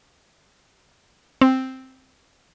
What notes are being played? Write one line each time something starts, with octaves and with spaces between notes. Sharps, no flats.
C4